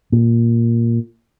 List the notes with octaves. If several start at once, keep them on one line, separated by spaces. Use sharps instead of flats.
A#2